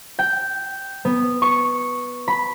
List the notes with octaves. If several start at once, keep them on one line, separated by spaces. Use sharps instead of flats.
G5
B3
C#6
B5